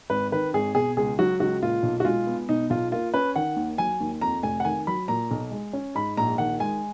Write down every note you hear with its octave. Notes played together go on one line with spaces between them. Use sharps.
G#1 B4
D#3 B4
G#1 G#4
B2 G#4
C#2 G#4
F#3 F#4
C#2 F#4
A#2 F4
B1
F#4
G#3 F4
B3
B2 D#4
B1 F4
A#3 F4
C#4 B4
D#3 F#5
D#2
F#3 G#5
D#2
F2 A#5
F1 G#5
F#5
D#3 G#5
F#3 B5
A#2 A#5
B1
G#3
C#4
G#2 B5
A#1 A#5
D#3 F#5
G#3 G#5